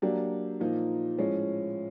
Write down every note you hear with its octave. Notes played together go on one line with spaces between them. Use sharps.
F#3 A#3 D4 G4
A#2 F3 A#3 D#4
A2 F3 G#3 C#4